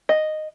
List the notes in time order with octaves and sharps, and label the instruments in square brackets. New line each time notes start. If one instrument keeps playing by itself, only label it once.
[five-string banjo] D#5